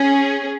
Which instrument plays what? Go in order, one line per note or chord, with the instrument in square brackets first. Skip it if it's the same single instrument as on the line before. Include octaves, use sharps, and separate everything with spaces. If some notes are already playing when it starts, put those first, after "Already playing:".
Already playing: [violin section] C#4 G#4